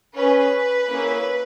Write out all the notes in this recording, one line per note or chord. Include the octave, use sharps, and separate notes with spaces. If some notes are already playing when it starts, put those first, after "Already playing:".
C#4 G#4 B4
A#3 C#4 E4 G#4